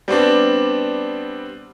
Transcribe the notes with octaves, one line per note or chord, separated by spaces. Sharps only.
G3 B3 C4 D4